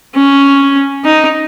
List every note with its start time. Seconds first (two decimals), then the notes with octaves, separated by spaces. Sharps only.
0.15 C#4
1.05 D#4